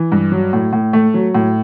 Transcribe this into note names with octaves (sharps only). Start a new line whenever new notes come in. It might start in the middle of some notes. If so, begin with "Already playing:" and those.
Already playing: E3
G2
F#3
A2
A2
A3
F#3
A2